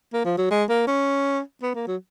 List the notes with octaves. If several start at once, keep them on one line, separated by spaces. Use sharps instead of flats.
A#3
F3
F#3
G#3
A#3
C#4
B3
A#3
F#3